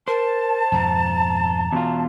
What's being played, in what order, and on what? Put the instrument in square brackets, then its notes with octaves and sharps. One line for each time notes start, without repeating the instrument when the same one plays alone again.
[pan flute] A#4 [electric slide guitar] C5 [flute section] A5
[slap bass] F2 G#2 B2 [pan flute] A#5
[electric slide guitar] E2 B2 F4